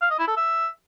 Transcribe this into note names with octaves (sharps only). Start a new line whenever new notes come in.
F5
D#5
E4
A4
E5